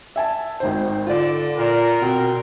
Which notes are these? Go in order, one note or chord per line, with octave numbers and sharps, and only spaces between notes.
E5 G#5 A5
G#1 D#3 C5
D3 F4 D5
A#2 A#4
B2 C4